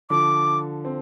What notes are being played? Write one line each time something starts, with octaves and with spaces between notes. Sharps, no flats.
D3 F3 D6
C4